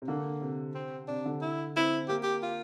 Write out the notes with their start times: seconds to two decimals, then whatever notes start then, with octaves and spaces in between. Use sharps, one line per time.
0.02 C3
0.08 D3 A#3
0.41 C3
0.75 C4
1.08 C3 D4
1.25 D3
1.42 E4
1.76 C4 E4
2.09 A#3 G4
2.23 G4
2.43 F4